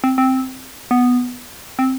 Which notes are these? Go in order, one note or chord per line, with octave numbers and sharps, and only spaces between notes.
C4
C4
B3
C4